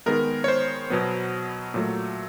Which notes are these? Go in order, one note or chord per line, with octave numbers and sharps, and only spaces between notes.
D#3 G#3 B3 A#4
C#5
C5
B2 F#3 B3
A#2 F#3 A3